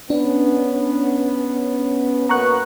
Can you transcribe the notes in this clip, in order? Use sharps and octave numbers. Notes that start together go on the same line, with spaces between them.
B3 C#4 D4
F#2 A#3 B3 A#5 C#6 F#6